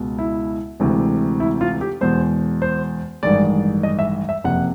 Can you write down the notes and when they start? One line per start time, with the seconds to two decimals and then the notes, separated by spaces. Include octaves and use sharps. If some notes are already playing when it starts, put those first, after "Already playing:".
Already playing: C#2 B2 G#3
0.18 E4
0.80 D2 C3 E3 G#3
1.40 E4
1.61 F4
1.81 G4
2.01 E2 B2 G#3 C5
2.62 C5
3.23 A1 G2 D#3 G#3 D5
3.83 D#5
3.99 E5
4.29 E5
4.44 F#1 F2 C3 F#5